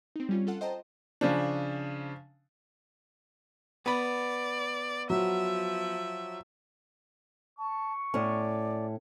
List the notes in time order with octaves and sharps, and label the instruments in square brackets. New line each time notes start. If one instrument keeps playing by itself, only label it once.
[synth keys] C4 D#4
G3 C#4 F4
F4 A4 F#5
C5 D#5 G5 A5 A#5
[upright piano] C#3 F3 D4
[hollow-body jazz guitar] B3 B5 [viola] D5
[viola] F3 E5 [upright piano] F#3
[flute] A5 [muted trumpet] C#6
[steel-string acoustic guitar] A2 C#4 [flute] D5